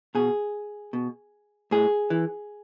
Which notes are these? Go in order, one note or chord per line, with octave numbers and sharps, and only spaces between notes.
B2 G#4
B2
A2 G#4
E3